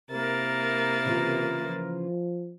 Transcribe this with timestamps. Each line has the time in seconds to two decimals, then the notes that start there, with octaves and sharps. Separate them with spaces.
0.10 C3 A#3 E4 A#4 A6
1.05 C#3 E3 F4
1.65 F3